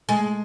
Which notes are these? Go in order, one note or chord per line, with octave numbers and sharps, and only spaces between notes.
G#3